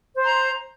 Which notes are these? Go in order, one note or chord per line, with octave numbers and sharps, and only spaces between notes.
C5 A#5 C6